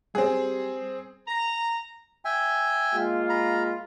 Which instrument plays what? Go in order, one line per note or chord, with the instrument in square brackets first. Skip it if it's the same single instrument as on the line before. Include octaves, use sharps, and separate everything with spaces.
[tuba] G3 [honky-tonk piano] C4 G#4
[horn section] A#5
[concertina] E5 G5 G#5
[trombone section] G#3 A#3 F4
[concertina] A#5 B5